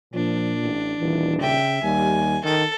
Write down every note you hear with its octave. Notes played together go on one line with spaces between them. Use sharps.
A#2 F3 D4
A1
D#1 E3
C#3 E5 G5
D#2 G3 G#5
D#3 A4